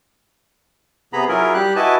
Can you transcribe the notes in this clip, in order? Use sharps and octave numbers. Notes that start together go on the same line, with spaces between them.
C3 B3 G#4 A#5 B5
F#3 C#4 E4 F4 G#4 A#4
G3 G4 F#6
E4 F#4 B4 D#5 G#5 A5